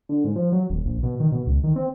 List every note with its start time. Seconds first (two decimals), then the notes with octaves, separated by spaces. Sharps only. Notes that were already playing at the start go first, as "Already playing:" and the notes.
0.09 D3
0.24 G#2
0.36 F3
0.52 F#3
0.70 D#1
0.85 A#1
1.03 B2
1.20 D#3
1.32 B2
1.47 C#2
1.64 D#3
1.76 C4